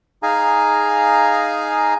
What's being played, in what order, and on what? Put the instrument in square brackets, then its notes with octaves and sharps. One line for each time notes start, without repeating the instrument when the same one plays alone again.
[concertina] D#4 G#4 F5 G#5 A#5